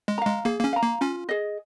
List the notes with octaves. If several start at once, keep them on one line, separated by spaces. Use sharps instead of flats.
G#3
F5 A#5
G#3
A#3 G#4
A#3
C#4
F5 A#5
A#3
C#4 F4
G#4 D#5